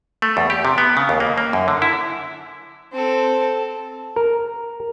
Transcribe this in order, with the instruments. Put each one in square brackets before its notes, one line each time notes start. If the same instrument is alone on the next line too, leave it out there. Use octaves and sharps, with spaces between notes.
[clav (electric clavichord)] A3
E2
G4
C3
B3
C#3
D#2
A#3
A#3
F#2
D3
E4
[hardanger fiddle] C4 A4
[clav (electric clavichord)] A#4